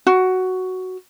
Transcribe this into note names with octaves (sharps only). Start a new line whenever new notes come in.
F#4